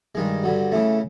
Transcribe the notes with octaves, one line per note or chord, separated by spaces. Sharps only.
G2 D#3 G#3
G2 D3 F#3
C#3 E3 A3